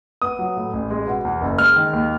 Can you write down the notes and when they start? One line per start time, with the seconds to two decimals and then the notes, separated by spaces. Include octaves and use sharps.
0.22 B3 D#6
0.39 F#3
0.56 A2
0.73 A1
0.90 G#3
1.07 B2
1.25 E2
1.41 F#1
1.58 G#3 F6
1.76 D#3
1.93 D#2